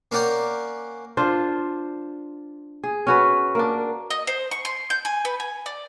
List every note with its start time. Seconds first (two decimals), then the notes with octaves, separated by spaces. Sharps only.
0.11 A#3 C#4 A#4 D5 F#5 G5
1.17 D4 F4 C5
2.84 G#4
3.07 C#4 F#4 B4
3.55 A#3 D4
4.10 D#5
4.27 C5
4.51 C#6
4.65 C6
4.90 G6
5.05 G#5
5.25 B4
5.40 G#5
5.66 D5